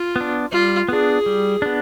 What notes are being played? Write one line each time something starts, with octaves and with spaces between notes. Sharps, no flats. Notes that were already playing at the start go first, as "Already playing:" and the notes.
Already playing: F4
B3
D4
G3 F4
B3 D4 G#4
G3
B3 D4